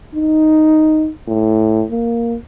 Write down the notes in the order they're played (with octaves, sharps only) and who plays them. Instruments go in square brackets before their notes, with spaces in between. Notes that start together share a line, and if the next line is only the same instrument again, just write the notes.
[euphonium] D#4
A2
A#3